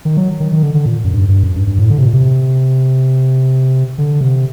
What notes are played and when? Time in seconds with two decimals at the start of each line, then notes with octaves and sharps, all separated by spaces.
0.05 D#3
0.17 F#3
0.40 D#3
0.52 D#3
0.63 D3
0.74 D3
0.86 A#2
1.04 F#2
1.13 G2
1.29 G2
1.43 F#2
1.55 G2
1.67 G2
1.79 A2
1.90 D3
1.98 C3
2.06 A#2
2.13 C3
3.98 D3
4.21 C3